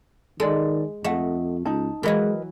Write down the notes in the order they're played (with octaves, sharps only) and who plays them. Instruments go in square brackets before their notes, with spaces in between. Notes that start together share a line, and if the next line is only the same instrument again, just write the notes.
[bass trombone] D#3 [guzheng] G#3 [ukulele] A4 D5
[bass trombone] F2 [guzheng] A3 [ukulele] D#5 F#5
[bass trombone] C#2 [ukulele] D#4 A5
[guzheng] E3 F#3 E4 [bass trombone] G#3 [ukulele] A#4 B4 D#5